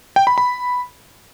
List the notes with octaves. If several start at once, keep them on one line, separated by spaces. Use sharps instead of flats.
G5
B5
B5